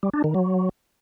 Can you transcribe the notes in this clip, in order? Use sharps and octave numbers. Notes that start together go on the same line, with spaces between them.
G3
D4
D#3
F#3